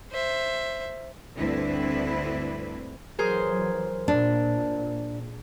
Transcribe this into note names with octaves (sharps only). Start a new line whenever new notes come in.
C5 E5
D2 G2 D3 C4 E4 B4
E3 F#3 G#4 A#4 C5
A#2 D4